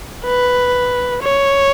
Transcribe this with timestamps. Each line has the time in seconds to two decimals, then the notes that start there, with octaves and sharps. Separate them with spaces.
0.25 B4
1.22 C#5